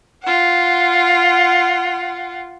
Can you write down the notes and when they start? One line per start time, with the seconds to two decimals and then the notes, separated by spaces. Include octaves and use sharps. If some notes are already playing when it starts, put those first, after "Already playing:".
0.23 F4 F#5